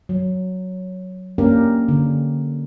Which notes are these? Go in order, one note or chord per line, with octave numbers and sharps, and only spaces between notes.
F#3
A#3 C#4 D4 G4 A#4
D3